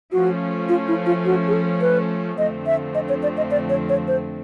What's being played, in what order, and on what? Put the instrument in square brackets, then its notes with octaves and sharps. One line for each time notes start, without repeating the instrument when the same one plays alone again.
[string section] F3 A3 C#4 [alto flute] F#4
[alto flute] F4
E4
F4
F#4
G#4
A4
B4
[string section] F2 D3 F3 A3 C4 [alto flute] D#5
[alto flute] E5
D#5
C#5
D5
D#5
D5
C#5
C#5
C5